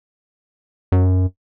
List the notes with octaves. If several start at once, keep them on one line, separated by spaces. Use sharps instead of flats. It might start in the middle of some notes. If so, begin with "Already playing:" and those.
F#2